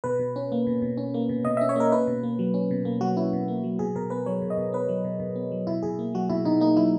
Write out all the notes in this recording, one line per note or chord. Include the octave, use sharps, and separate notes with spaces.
B2 B4
B2
C#4
A#3
B2
B2
C#4
A#3
B2
B2 D#5
C#4 E5
C#5
A#3 A#4
C#4 B4
B2
A#3
F#3
C#4
B2
A#3
F#3 F#4
C#4 E4
B2
A#3
F#3
B2 G#4
B2 A#4
B3 B4
F#3 C#5
B2
D#5
B2
B3 B4
F#3
B2
B2
B3
F#3
B2 E4
B2 G#4
A#3
F#3 F#4
B2 E4
B2 D#4
A#3 D#4
F#3 E4